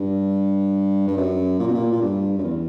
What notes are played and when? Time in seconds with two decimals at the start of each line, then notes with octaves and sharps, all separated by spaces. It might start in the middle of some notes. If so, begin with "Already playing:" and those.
Already playing: G2
1.07 G2
1.17 F#2
1.59 A#2
1.67 B2
1.74 A#2
1.92 A#2
2.02 G2
2.38 F#2
2.43 E2